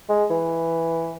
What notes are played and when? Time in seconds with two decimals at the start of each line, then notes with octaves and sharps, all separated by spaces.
0.09 G#3
0.30 E3